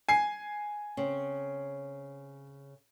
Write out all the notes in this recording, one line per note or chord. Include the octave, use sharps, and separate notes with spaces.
G#5 C7
C#3 C4